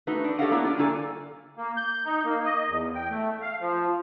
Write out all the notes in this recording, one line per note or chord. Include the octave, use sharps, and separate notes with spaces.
A3 D#4 F#4 B4
D4
G4 A4 C#5 D#5 F5 F#5
A#3 B3 D4 E4 B4
D4 F4
G2 D3 A#3 A4 D5 G#5
A#3
G6
D#4
A#3
D#5
E2
G5
A3
F5
F3